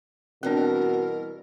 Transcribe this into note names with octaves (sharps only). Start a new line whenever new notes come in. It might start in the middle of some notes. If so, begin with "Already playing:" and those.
B2 E3 G3 C4 D4 A#4